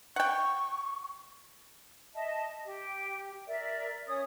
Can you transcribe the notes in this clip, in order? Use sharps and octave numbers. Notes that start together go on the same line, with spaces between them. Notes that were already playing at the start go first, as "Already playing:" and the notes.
F#5 G5 C#6
D#5 E5 A5
G4
A#4 D5 E5
C#4 C#5 D#6